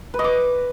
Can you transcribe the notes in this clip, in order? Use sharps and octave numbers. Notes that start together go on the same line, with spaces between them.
B4
D#5
D6